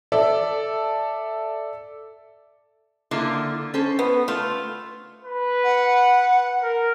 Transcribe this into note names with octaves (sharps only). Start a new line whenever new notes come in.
A4 D5 E5
D3 A#3 E4 F4
C#4 A4 C5
B3
A3 F4
B4
F#5
A#4